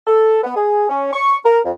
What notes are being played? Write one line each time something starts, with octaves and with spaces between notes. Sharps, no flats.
A4
B3
G#4
C#4
C#6
A#4
F2